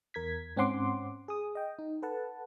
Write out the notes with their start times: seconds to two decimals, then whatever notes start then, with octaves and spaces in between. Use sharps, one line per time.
0.14 E2 A#4 G#6 B6
0.57 G#2 C4 C#4 F#5 C6 D6
1.28 G#4 D#6
1.55 D#5 G5
1.79 D#4
2.02 A4 B4 F#5 A5